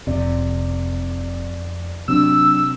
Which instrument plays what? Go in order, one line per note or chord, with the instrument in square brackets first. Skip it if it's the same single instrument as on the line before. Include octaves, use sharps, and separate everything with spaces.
[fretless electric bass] F1 C3 [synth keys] F2 D5
[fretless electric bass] C3 [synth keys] F#3 C4 D4 [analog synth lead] E6